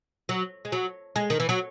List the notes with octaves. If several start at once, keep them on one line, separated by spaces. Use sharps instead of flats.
F#3
G#3
F#3
G#3
D#3
E3
F#3